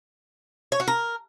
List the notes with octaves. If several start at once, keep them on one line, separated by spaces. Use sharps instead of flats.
C#5
F#4
A#4